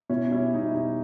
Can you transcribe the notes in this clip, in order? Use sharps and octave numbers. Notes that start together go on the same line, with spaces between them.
B2 C#4 E4
G3 C#4 E4
B2 D#4
E4
G3 D#4